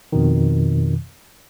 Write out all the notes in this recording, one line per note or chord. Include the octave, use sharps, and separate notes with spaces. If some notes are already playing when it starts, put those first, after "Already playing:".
F2 B2 D#3